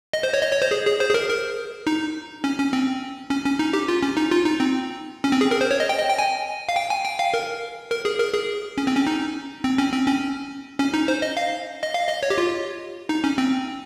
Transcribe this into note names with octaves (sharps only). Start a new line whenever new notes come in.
D#5
C5
C#5
D#5
C#5
C5
G#4
G#4
C5
G#4
A#4
A#4
D#4
C#4
C#4
C4
C#4
C#4
D#4
G4
F4
C#4
D#4
F4
D#4
C4
C#4
C4
G#4
A#4
C5
C#5
D#5
G5
D#5
G5
G#5
F5
G5
G#5
G5
F5
A#4
A#4
G#4
A#4
G#4
C#4
C4
C#4
D#4
C4
C#4
C4
C#4
C#4
D#4
C5
D#5
F5
D#5
F5
D#5
C#5
G4
F4
D#4
C#4
C4